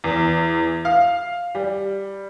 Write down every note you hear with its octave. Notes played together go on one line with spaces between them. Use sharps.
E2
F5
G3